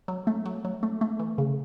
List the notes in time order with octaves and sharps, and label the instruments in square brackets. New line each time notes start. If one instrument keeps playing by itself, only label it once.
[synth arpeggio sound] F#3
A3
F#3
F#3
A3
A3
E3
C#3